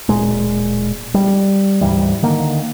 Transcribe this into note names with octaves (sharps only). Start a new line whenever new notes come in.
D1 C#2 A#2 G#3
G3
D2 G#2 E3 G3
D3 D#3 A#3